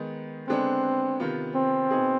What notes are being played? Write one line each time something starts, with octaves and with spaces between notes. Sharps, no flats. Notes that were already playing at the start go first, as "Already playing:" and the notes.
Already playing: D#3 G#3 B3 D#4
D3 G#3 B3 C4 D4
C3 D#3 B3 F4
C4
B2 B3 D#4 G#4